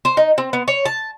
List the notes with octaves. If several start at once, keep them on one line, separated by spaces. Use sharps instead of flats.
C5
D#4
C4
B3
C#5
A5